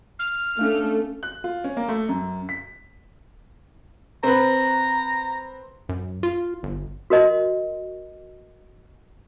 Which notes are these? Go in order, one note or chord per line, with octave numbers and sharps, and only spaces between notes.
F6
A3 C#4 D4 F5
F#6
F4
C#4
A#3
A3
F#2
B6
C4 B4 A#5
F#2
F4
G1
F#4 A#4 D#5 C6